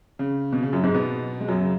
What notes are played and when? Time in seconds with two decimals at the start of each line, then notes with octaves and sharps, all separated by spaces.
0.19 C#3
0.53 B2
0.63 C#3
0.73 F#2 F#3
0.83 G#2 G#3
0.94 B2 B3
1.41 G#3
1.48 F#2 F#3
1.61 C#3